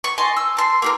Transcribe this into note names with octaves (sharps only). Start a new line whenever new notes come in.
C#6
D#5 G#5 A5 C6
E6
A5 C6
A#3 G4 A#4